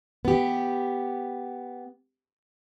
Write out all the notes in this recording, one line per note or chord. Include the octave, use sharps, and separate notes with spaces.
B3 G4